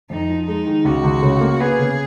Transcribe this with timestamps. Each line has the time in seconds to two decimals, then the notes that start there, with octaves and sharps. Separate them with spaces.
0.10 F2 D#4
0.29 F3
0.47 G#3 D#4
0.66 D#3
0.85 C#2 F#4
1.04 C#2
1.23 C#3
1.41 A#3
1.61 B3 G#4
1.79 C#3